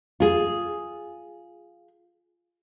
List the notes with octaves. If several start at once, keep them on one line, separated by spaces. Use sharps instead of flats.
F4 G#4